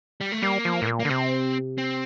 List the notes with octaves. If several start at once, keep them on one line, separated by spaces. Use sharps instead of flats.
G3
A3
G3 A#3
F3
A2
A#2
A#3
D3
C3 C4
C4